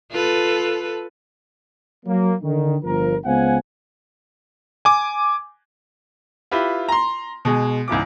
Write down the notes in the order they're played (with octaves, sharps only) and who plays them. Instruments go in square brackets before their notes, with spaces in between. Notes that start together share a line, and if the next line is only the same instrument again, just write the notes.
[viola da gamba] F4 A4 B4
[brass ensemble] F#3 A#3
D3 D#3
G1 F3 A#4
C#2 B3 C5 F5 F#5 G#5
[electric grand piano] G#5 D6
[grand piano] E4 F4 G4 B4
A#5 C6
B2 G#3 G#4
C#2 G#2 E3 D6